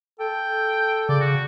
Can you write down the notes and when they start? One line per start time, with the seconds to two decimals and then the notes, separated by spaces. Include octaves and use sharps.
0.19 A4 G5
1.09 C#3 D5
1.21 F#4